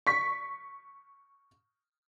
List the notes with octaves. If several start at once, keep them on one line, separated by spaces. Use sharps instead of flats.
C#6 B6